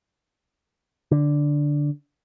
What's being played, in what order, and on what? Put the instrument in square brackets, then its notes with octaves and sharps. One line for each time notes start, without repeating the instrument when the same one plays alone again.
[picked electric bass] D3